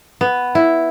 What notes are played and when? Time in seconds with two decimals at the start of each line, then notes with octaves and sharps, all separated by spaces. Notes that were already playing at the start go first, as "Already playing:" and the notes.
0.21 B3
0.55 E4